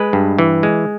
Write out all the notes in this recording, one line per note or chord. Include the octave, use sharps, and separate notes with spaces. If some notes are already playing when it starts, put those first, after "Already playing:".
Already playing: G#3 B4
G2
E3
G#3